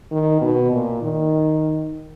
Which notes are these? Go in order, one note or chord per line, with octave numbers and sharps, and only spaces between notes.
D#3
B2
A#2
D#3